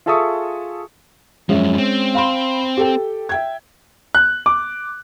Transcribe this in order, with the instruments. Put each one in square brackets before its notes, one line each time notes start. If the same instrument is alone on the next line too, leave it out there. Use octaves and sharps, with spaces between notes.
[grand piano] F4 G#4 A4 E5 C#6 D#6
[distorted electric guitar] F#2 F3 [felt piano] G#3 C#4 E5
[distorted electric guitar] C4
[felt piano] F5 B5 C6
G4 A4 G5
E5 G5 G#6
[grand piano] F#6
D6